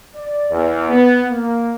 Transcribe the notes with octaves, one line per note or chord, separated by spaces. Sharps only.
D5
E2
B3
A#3